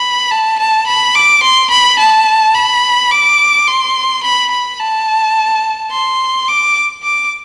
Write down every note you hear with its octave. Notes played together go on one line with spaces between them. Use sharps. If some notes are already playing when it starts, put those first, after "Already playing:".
Already playing: B5
A5
A5
B5
D6
C6
B5
A5
B5
D6
C6
B5
B5
A5
C6
D6
D6